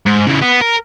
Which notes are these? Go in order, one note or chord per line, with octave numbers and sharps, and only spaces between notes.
G#2
C#3 E3
B3
A#4